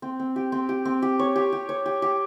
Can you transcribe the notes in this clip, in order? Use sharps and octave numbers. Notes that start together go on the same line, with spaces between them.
C4
C4
G4
C4
G4
C4
G4
C#5
G4
G4
C#5
G4
G4